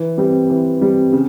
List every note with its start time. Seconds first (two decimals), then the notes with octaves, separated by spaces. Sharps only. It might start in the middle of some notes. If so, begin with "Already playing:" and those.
Already playing: E3
0.18 G3 C4
0.50 E3
0.81 G3 C4
1.13 C#3